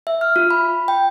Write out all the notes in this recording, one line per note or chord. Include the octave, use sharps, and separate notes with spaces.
E5
F6
F4
B5
G5